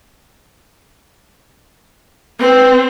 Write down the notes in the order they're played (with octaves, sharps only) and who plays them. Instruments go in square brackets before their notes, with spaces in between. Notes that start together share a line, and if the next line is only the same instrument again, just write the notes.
[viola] C4 [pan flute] B4